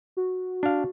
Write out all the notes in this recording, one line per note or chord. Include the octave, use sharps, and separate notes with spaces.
F#4
D4 F5